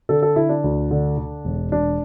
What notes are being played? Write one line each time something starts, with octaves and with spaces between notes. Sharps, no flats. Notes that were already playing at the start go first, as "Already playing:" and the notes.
D3 A4
A4
D3 E4
D4
D2
D3
D3
E1
E1 D4